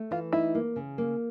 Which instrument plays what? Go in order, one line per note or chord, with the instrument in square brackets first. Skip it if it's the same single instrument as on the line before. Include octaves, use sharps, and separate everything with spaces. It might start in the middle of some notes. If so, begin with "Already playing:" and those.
Already playing: [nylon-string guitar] A3
[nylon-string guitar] E3 [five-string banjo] F4
[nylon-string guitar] D#4 [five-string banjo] E4
[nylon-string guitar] A#3
C#3
A#3